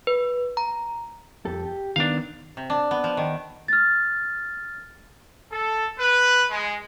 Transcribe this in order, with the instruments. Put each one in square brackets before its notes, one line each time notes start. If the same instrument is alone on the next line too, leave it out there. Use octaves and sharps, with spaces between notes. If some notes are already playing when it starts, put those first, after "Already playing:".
[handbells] B4
A#5
[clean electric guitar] F2 G4 A4
G4
[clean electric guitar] D#3 B3 [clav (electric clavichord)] D4 F5
[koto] C3
D4
B3
F3
D#3
[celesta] F6 A6
[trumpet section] A4
B4
G#3